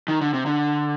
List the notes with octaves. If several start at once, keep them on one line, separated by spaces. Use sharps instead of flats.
D#3
D3
C3
D3